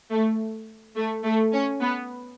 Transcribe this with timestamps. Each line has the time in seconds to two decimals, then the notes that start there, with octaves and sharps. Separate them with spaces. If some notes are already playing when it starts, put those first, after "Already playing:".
0.11 A3
0.96 A3
1.25 A3
1.53 C#4
1.81 B3